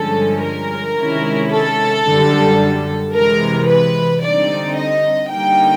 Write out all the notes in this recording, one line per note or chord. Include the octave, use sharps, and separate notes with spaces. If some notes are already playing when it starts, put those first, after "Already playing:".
Already playing: G2 D3 F3 G#3 C#4 A4
A#4
C3 D#3 G#3 C#4 E4
A4
F#2 D3 G3
C3 E3 G#3 A#4
B4
D3 G3 C4 D#4 D5
D#5
D3 G3 A#3 D#4 G5